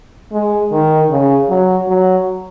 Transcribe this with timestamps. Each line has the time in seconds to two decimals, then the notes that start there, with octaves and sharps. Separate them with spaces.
0.32 G#3
0.72 D#3
1.10 C#3
1.50 F#3
1.88 F#3